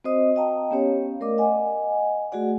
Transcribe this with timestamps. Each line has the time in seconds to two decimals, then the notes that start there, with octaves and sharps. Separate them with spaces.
0.04 C4 F#4 C5 D#5 D#6
0.36 D#5 F5 G5 A5 A#5
0.71 B3 C#4 G4 C#5 F5
1.20 A3 A#4 D5 D#5 D6
1.38 D#5 F#5 G#5
2.32 A3 F#4 G#4 D5 F#5